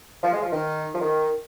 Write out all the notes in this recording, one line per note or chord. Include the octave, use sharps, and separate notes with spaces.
F3
G#3
F3
D#3
F3
D#3